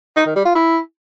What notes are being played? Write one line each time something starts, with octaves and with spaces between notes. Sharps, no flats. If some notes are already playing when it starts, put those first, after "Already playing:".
D#4
D#3
G3
F4
E4